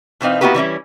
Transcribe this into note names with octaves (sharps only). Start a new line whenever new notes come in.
B2 E3 C4 D#4 F5
A#3 B3 E4 F#4 G4 B4
E3 G3 C#4 E4